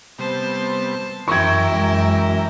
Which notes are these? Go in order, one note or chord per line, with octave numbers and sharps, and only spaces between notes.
C3 G3 B3 C5 A5
F#2 E3 E4 A#4 G5 C#6 G#6
F#2 G#3